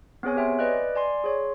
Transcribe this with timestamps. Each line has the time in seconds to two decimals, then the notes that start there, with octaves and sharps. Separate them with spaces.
0.23 B3 C4 G#4 C#5 G#5
0.36 G4 C#5 E5 G5 G#5 C6
0.59 B4 D5 D#5 G5 F#6
0.95 D5 G#5 C6
1.24 G#4 C#5 C6